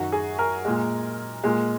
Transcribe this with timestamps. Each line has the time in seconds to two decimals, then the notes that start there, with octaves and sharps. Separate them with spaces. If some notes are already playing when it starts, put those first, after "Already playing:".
Already playing: F#2 D#3 F#3 F#4
0.12 G#4
0.39 A#4
0.65 A#2 G#3
1.44 A#2 G#3